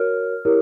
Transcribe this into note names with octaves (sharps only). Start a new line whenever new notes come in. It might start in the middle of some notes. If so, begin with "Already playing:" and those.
Already playing: F#4 A#4 C#5 F6
E4 G4 A#4 C#5